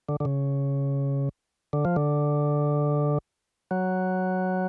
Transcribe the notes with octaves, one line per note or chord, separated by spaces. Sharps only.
D3
D3
C#3
D3
F3
D3
F#3